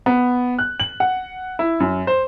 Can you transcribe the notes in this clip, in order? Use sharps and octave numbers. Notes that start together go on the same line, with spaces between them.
B3
F#6
F#7
F#5
E4
F#2
C5